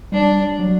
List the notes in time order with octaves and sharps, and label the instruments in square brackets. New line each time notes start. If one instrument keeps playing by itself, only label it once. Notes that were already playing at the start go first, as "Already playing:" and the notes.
[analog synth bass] G3 [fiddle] D4
[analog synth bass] F#3